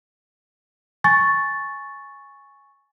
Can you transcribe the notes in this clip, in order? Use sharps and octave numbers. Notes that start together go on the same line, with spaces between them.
G#5 C#6 A6